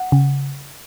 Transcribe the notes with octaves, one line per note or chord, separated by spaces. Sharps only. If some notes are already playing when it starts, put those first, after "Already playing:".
Already playing: F#5
C#3